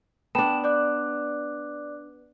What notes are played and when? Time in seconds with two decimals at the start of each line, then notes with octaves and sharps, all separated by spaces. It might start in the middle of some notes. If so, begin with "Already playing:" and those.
0.35 B3 D4 G5 A5 E7
0.64 D5 D6 F#6